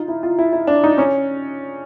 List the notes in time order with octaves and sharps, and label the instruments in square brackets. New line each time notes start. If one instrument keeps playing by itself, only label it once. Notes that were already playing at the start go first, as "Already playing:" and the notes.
Already playing: [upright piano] D#4 F4
E4
F4
E4
E4
D4
D#4
C#4